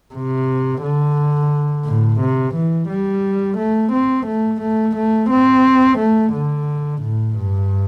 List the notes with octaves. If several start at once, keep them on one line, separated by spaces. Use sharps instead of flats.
C3
D3
A2
C3
E3
G3
A3
C4
A3
A3
A3
C4
A3
D3
A2
G2